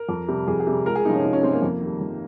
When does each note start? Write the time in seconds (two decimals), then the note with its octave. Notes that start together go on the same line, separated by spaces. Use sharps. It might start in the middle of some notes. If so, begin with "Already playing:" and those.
Already playing: A#4
0.09 F2
0.28 C3 G3
0.47 F2 G#4
0.60 G#4
0.67 C3 G3
0.86 C#2 A#4
0.95 G#4
1.05 C3 D#4
1.10 F3 C#4
1.24 C#2 D#4
1.33 C#4
1.43 C3 F3 C4
1.53 A#3
1.62 F2
1.81 D#3 G3
2.01 F2